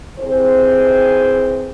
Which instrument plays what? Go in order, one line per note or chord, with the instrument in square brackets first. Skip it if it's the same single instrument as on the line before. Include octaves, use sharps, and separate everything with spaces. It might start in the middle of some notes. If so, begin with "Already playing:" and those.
[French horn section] C3 E3 C4 G#4 C5